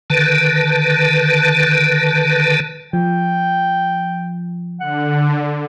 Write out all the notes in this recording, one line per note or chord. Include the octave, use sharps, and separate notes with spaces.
D3 D#3 B4 A5
F3 G5
D3 F#5